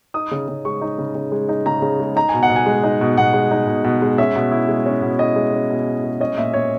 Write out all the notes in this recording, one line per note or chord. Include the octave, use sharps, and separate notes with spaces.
D#4 D#6
C#3
C#3
G#3 C#6
D#4
C#3
C#3
G#3
D#4
C#3 A#5
C#3
G#3
D#4 A#5
B2 G#5
F#5
B2
G#5
G#3
D#4
B2
B2 F#5
G#3
D#4
B2
B2
G#3
C#4 E5
B2
E4
G#3
C#4
B2
E4 D#5
G#3
C#4
B2
E4
G#3
C#4 D#5
A#2 E5
A#2 C#5